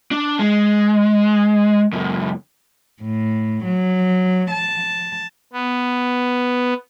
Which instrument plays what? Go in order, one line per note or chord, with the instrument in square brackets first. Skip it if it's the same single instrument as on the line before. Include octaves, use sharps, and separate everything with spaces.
[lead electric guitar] D4
G#3
C#2 F#2
[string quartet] A2
F#3
A5
[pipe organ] B3